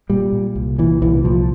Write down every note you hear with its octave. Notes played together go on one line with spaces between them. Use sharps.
A#2 G3
A#2
C2
A#2 E3
C2 E3
A#2 F3